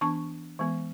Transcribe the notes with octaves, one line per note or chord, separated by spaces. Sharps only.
E3 B3 D4 A5 C#6
E3 G#3 B3